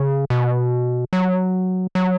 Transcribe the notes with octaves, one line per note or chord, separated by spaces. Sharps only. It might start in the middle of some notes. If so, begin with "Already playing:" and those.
Already playing: C#3
B2
F#3
F#3